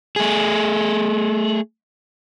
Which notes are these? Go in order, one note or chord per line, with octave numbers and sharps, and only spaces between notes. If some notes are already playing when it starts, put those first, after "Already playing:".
A3 G#4